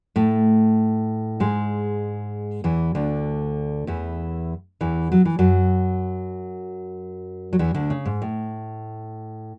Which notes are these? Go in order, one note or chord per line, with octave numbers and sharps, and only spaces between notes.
A2 A3
G#2 G#3
E2 E3
D2 D3
E2 E3
E2 E3
F#3
E3
F#2 F#3
F#3
E2 E3
D2 D3
C#3
G#2
A2